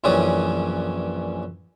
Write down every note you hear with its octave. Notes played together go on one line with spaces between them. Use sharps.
A#1 F#2 E3 G3 C#4 D#6